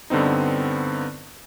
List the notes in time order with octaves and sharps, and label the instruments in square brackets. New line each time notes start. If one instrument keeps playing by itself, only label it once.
[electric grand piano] G2 D3 B3 C4 D#4